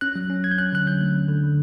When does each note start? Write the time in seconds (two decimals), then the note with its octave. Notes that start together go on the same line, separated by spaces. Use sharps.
0.01 C#4 F#6
0.16 F#3
0.30 C#4
0.44 F#3 G#6
0.51 G6
0.58 C#4 F#6
0.73 D3 F#6
0.86 F#3 G6
1.01 A3
1.14 D3
1.29 D3
1.44 D3